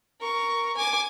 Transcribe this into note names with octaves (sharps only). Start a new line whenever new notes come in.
A#4 C#6
G#5 D6